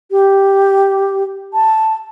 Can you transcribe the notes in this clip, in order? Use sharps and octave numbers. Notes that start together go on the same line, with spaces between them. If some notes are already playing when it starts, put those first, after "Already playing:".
G4
A5